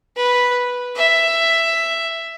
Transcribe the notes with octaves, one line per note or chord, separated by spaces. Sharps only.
B4
E5